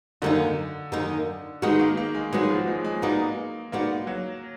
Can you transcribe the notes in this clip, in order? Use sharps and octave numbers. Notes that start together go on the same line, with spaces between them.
F#2 D3 D#3 A#3 D#4
F#2 D#3 A#3 D#4
D#3 G#3 B3 D#4 F#4
A#3
A#3
G#3
F#3 G#3 B3 D#4 F#4
F3
G#3
G#3
G#3 A#3 B3 D#4 F#4 D5
G#3 A#3 B3 D#4 F#4 D5
F#3